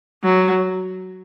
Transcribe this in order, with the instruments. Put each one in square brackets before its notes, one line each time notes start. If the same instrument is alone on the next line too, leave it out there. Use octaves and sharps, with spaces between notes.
[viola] F#3